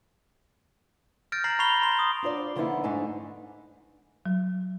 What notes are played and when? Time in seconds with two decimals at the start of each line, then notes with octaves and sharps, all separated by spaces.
1.32 F6 G6 A6 A#6 D7
1.44 A#5 A#6 C7 F#7
1.59 A#5 B5 C#6 C7 F7 G7
1.81 A#5 C6 G7
1.99 D#6
2.23 D4 F4 C5 D5
2.56 D3 F3 A#3 B3 D#4 E4
2.83 F2 G#2 A3 D4 D#4 G#5
4.26 F#3